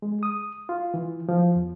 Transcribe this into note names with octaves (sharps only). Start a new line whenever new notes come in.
G#3
D#6
F4
E3
F3
E2